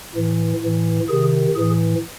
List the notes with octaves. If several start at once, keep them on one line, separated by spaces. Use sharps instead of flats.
A2 E3
A2 E3
C3 D#3 G#4
A2 E3 G#4